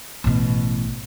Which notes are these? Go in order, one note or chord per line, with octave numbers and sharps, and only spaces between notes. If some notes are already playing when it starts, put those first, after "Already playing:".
A1 B2